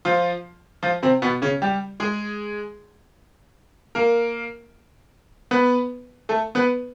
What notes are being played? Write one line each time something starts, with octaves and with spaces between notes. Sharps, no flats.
F3 F4
F3 F4
C3 C4
B2 B3
C#3 C#4
G3 G4
G#3 G#4
A#3 A#4
B3 B4
A3 A4
B3 B4